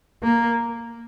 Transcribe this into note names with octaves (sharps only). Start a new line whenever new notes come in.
A#3